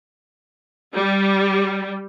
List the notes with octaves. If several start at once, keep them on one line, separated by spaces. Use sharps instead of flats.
G3